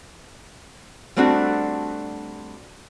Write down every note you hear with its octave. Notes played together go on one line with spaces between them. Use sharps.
G3 A3 C4 D4 F#4